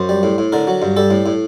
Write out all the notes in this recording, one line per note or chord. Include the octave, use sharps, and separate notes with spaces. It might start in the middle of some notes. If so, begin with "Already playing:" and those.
Already playing: F#2 C5
G3
A2
A2
D3 A#4
F#3
G2
G3 A4
A2
A2